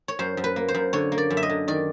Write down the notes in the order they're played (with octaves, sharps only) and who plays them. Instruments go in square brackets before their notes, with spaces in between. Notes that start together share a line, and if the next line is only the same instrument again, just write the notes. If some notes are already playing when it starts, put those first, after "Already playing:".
[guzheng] C#5
F#2 C5
F#2
B4
A#3
C5
F#2
D3 C#5
A#3
D5
F#2
E5
D#5
D3
D#3 D5